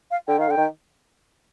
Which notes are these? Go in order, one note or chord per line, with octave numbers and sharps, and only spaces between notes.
F5
D3 G5
D#3 F5
D3 G5
D#3